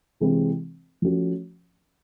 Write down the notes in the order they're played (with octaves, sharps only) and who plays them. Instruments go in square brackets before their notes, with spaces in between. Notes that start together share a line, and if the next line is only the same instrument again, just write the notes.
[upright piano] C3 E3 G#3 C4 E4
F3 A3 C#4 F#4